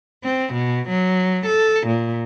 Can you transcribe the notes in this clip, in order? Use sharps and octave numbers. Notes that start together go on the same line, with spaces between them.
C4
B2
F#3
A4
A#2